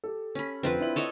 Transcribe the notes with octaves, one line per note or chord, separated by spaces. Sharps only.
G4 A4
C#4 B5
F1 D3 C4 F4 B4
D4 E4 F#7
A4 C#5 D#5